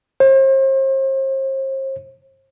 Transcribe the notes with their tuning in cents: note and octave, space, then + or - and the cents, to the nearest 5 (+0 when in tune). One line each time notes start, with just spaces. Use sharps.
C5 +40